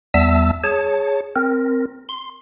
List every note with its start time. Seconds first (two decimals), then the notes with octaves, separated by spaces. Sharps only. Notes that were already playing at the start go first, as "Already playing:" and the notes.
0.14 E2 G3 B3 E5 A5 E6
0.64 G#4 C#5 A5
1.36 C4 A#4
2.09 C6